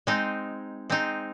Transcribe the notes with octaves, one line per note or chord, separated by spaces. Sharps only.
G#3 C4 D#4
G#3 C4 D#4